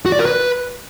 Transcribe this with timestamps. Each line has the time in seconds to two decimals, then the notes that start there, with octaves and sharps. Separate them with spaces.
0.06 F#4
0.12 D5
0.19 A#4
0.26 B4